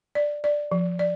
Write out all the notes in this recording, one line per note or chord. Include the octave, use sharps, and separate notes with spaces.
D5
D5
F3
D5